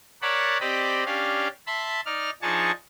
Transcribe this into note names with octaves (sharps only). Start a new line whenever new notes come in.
A#4 C#5 D5 F#5 A5 B5
C4 G4 D5 D#5 B5
C#4 D4 G4 D5 F5
E5 A5 B5 C6
D#4 D5 F6
F3 D4 D#4 G#4 A5 C#6